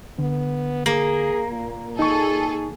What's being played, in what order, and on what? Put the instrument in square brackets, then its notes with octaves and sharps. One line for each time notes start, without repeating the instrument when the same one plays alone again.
[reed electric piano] D3 [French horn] B3
[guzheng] A#3 [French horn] G#4
[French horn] A#2
[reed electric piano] D#4 C#6 [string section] G#4 A4